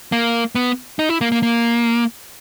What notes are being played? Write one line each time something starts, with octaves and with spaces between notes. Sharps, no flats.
A#3
B3
D#4
E4
A#3
A#3
A#3